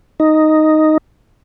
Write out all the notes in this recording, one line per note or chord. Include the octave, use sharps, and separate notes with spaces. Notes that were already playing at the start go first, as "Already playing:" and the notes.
D#4